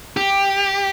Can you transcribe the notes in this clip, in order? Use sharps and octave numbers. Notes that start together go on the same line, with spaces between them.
G4